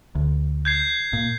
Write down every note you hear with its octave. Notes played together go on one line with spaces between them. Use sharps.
D2
G6 G#6 C7
A#2